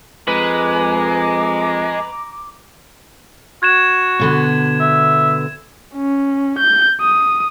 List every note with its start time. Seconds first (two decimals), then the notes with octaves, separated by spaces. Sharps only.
0.28 F2 G#3 B4 A#5 D6
3.63 F#4 G#6 E7
4.20 B2 D3 B3
4.80 E5
5.95 C#4
6.59 G6
7.01 D#6